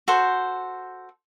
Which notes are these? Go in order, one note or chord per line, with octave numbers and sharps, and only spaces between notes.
F#4 A4 C5